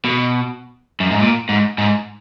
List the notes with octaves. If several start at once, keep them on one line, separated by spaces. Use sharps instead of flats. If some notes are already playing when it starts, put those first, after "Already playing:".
B2
F#2
G#2
A#2
G#2
G#2